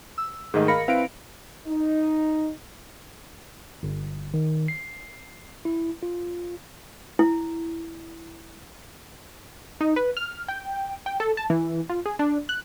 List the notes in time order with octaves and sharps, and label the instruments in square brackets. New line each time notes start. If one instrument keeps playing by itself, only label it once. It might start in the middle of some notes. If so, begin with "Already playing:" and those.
[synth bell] E6
[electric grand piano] G#2 D#3 A3 [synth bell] G#4 D#5
[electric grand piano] A#4 F5 [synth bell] B5 A#6 C#7
[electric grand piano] C4 E4 B4 [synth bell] F5 D7
[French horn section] D#4
[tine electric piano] G1
D#3
C7
E4
F4
[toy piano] E4
[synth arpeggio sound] D#4
B4
F6
G5
G5
A4
A5
E3
F4
G#4
D4
F#6